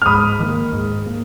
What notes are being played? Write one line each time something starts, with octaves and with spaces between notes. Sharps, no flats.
F6
G#2 B5 D#6
D#3 A#3
G#2
A#3